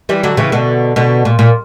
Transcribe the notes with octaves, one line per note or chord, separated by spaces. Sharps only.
E3 G3
D3 F#3
C#3 E3
B2 D3
B2 D3
A#2
A#2